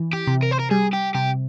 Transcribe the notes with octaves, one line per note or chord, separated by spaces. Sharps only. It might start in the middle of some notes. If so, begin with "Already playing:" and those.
Already playing: E3
G4
C3
A#4
C5
A#4
G3 G#4
G4
C3 G4